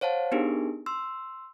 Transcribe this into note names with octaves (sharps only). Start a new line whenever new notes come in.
C5 C#5 F5 F#5 A5
B3 D4 D#4 G4 G#4 A#4
C6 E6